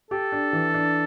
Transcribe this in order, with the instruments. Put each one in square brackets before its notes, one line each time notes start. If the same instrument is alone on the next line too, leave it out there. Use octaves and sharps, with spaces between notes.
[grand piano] G4 [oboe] A4
[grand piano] D4
E3
D4